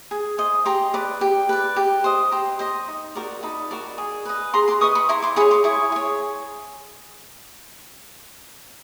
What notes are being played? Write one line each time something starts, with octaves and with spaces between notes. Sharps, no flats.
G#4
C5 D#5
G4 A#5 C6
B4 D5
G4
B4 D5
G4
C5 D#5
G4 A#5 C6
C5 D#5
D#4
F#4 A#4 D5
D#4 A5 B5
F#4 A#4 D5
G#4
B4 D#5
G#4 A#5 C6
C6 D6
B4 D#5 C#6 D#6
B5 C#6
E4 A#5 C6
C6 D6
G#4 C#5 B5 C#6
C6 D6
E4 C#6 D#6
G#4 C#5